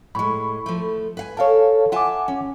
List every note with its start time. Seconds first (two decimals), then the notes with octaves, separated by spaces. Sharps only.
0.15 A2 G#3 B5 C#6
0.66 F3 A3
1.17 B4 F5 G#5
1.37 A4 A#4 C#5 F5 A5
1.92 F4 E5 F#5 G#5 A5 D6
2.28 C#4